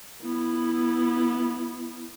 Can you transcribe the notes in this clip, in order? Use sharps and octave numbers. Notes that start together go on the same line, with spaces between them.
B3 E4